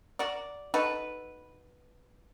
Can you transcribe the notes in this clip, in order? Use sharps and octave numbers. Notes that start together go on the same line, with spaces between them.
F#4 A#4 D5
D#4 F#4 A4 B4